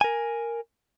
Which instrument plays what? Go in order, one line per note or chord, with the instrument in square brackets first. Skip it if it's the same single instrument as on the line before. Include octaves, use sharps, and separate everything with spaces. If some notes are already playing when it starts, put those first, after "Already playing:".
[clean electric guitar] A#4 G#5